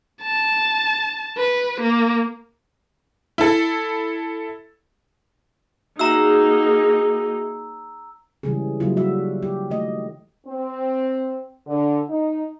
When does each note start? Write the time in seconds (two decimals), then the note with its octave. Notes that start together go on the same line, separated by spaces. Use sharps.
0.22 A5
1.38 B4
1.81 A#3
3.38 E4 A4
5.99 A#3 D#4 F#4 G#4 E5 F#5 A#5 E6
8.43 C#3 E3 G3 G#3 C#4 G#4
8.80 C#3 F#3 G3 A#3 E4 F4
8.97 G3 F#4 E5
9.43 G4
9.70 D#3 A3 D#5
10.46 C4
11.66 D3
12.08 D#4